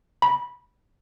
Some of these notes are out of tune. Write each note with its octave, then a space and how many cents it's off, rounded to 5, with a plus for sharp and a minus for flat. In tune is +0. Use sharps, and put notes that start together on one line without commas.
B5 -15